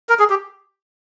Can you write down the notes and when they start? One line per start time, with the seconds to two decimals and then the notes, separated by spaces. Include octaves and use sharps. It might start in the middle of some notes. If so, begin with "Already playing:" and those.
0.09 A#4
0.19 G#4
0.30 G4